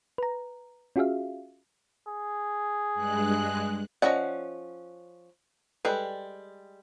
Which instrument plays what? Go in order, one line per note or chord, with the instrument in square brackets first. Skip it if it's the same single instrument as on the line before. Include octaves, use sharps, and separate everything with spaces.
[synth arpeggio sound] B4 A#5
C#4 F4 F#4 G#4 E5 F5
[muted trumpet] G#4
[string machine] G2 G#3 F#6
[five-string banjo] F3 C#4 F#5 [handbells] D5 D#5
[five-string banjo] G3 G#3 [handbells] A4 B4